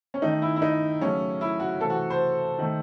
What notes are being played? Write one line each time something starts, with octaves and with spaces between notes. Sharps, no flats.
C#4
D#3 A3 D#4
E4
E4
D#4
C#3 F#3 A3 C#4
E4
F#4
C3 E3 A3 A4
F#4
C5
D#3 A3